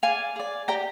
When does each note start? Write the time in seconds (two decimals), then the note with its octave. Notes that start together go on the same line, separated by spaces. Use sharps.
0.03 G#4 D5 F5 G#5
0.36 G#4 D5
0.68 G4 D5 G5 A#5